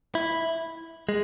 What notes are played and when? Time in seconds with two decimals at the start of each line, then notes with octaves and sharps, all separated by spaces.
0.15 E4
1.09 G#3